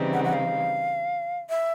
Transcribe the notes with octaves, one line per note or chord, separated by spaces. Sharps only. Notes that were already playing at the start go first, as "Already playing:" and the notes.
Already playing: C#3 E3 G3 C4 D#4
F#5
F#5
F5
E5